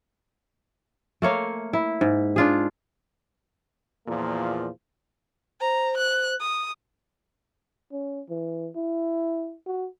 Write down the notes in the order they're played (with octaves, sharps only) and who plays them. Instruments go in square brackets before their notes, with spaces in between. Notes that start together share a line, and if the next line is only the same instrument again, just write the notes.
[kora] A3 A#3 C#5 F5
E4
G#2
D4 F4 G#4
[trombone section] E2 A#2 F3 A#3
[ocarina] C5 [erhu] A#5
[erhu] F#6
D#6
[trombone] C#4
E3
E4
F#4